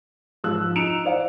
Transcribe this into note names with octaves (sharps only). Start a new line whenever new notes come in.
G#2 F3 E6 F#6
D#4 C#7 D7 E7 F7
C5 D5 F5 F#5